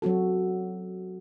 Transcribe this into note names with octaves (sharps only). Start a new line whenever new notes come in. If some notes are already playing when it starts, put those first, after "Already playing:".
F#3 C4 F#4 A4